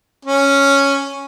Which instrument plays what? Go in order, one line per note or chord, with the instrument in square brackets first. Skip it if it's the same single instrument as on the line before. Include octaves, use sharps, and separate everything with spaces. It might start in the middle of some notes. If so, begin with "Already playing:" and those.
[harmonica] C#4